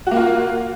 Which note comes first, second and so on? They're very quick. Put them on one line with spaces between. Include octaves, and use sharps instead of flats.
F#4 A#3 F4